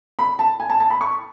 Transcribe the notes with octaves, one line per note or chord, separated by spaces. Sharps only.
B5
A5
G#5
A5
A5
B5
C#6